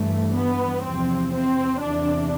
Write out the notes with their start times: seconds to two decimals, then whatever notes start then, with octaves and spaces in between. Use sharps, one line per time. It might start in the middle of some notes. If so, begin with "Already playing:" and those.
Already playing: G2 E3 A3
0.35 B3
0.83 E2 C3 F3 C4
1.33 C4
1.81 E2 C3 E3 D4